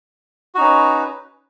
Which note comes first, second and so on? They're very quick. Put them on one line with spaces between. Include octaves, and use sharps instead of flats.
F#4 D#4 C#4 B4